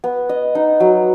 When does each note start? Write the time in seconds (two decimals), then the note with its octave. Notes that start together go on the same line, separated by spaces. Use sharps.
0.04 B3
0.29 D#5
0.55 D#4
0.80 F#3